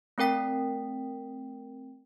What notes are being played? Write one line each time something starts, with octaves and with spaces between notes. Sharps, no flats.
A3 C4 A#4 G5 B6